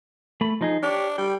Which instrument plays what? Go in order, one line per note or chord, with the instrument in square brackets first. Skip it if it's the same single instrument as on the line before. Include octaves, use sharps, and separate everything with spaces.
[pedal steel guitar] A3 B5
F3 D#4 G#4
[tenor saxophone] D4 [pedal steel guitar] G4 C#5
[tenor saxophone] G3 [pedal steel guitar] G5